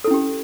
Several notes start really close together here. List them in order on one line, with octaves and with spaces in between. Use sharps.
A4 E4 C#4 G4